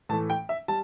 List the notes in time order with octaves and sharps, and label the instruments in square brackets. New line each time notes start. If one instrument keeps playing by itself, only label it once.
[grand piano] A2 E3 A3 A5
G5
E5
G3 A5